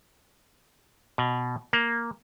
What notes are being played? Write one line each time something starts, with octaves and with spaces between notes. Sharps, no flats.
B2
A#3